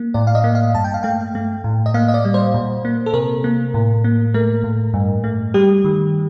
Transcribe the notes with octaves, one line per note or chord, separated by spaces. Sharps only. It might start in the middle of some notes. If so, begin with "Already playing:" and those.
Already playing: A#3
A2 D5
F5
D#5
A#3
F5
G2 A5
G5
F5
A3 G5
A3
A2
D#5
A#3 F5
D#5
D5
G3
C5
A#2
A#3
A4
C3 A#4
A#3
A2
A#3
A3 A#4
A2
G2
A3
G3 G4
D#3